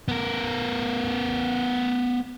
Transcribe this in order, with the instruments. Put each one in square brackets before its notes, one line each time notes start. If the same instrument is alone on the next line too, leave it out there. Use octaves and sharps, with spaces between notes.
[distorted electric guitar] B3 A#4